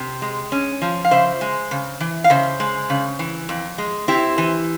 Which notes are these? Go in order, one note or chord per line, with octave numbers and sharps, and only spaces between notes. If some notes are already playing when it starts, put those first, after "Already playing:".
Already playing: C3
G#3
C#4
F3
F5
C#3 C5 E5
G#3
C#3
E3
F5
C#3 C5 E5
G#3
C#3
E3
F2
G#3
C4 E4 G4
E3